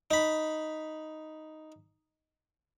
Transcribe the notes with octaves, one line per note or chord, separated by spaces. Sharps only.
D#4 B5